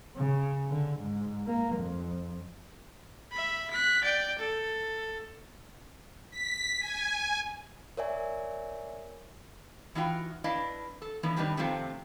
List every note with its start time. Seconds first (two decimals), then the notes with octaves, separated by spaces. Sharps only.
0.16 C#3
0.70 D3
1.00 G#2
1.47 A#3
1.76 F2
3.32 E5 B5
3.71 F#6 B6
4.04 D5 G5
4.39 A4
6.31 B6
6.79 G#5
7.97 A#4 C#5 D5 E5 G#5
9.95 E3 D#4 F4 F#4 G5
10.44 D4 E4 B4 D5 D#5 F5
11.02 A4
11.23 E3 F3 B3 D4 D#4
11.36 C3 D#3 G3 D4 D#4 B4
11.57 F2 C3 D#3 A3 C4 F4